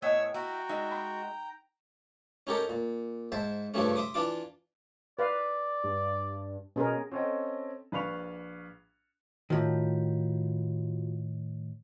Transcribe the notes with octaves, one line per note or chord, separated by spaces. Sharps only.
A2 B3 C#5 D#5 F#5 G#5 E6
E4 F#4 G5 A#5
G#3 D#4 E5
B5
C#4 D#4 G4 A4 A#4
A#2
G#2 C5 E5 A5
G2 C#3 F3 G3 A3 C#4
E5 C6 D6 D#6
E3 D4 F4 D6
B4 D5 F5
G2
B2 C#4 G#4 A#4
C4 C#4 A4 D#5 G5
A#1 B4 F5 B5 C#6 F7
A2 D#3 F4 F#4